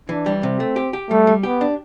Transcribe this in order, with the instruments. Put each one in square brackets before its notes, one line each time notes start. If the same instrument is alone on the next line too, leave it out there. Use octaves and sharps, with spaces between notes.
[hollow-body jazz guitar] E3 [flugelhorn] D4
[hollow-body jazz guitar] G3
[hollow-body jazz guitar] C3 [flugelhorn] C4
[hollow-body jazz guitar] A3
G4
G4
[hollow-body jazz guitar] G3 [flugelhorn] A3
[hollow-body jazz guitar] G3
[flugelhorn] B3 [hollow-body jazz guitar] G4
[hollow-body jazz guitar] D4